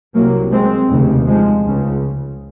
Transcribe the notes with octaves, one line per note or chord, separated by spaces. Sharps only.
C2 C3 F#3 A#3
G#3 C4
F1 D#2 C#3
F3 G#3
C#2 C#3